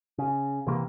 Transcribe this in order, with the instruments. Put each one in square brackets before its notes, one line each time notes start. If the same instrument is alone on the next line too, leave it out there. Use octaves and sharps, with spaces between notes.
[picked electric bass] C#3
C2 C3 E3 A#3